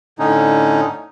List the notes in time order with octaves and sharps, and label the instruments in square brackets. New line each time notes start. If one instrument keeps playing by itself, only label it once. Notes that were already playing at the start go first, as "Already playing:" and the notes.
[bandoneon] A2 D3 C#4 D#4